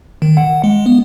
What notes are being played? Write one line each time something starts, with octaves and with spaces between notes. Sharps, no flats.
D#3
F#5
G#3
B3